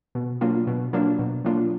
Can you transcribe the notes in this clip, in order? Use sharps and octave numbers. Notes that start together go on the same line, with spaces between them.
B2
F#3 A#3 D4 F4
B2
F#3 A#3 D4 F4
B2
F#3 A#3 D4 F4